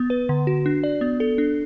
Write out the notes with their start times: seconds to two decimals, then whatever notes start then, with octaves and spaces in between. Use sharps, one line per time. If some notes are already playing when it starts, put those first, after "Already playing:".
Already playing: B3
0.10 B4
0.29 D3
0.47 F#4
0.66 D4
0.84 D5
1.01 B3
1.20 A4
1.38 D4